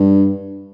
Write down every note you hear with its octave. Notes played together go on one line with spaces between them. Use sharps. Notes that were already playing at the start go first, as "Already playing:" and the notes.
Already playing: G2